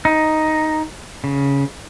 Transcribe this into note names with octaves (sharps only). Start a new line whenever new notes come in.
D#4
C#3